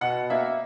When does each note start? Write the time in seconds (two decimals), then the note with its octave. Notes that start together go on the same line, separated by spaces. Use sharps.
0.01 B2 F#5
0.30 A#3 E5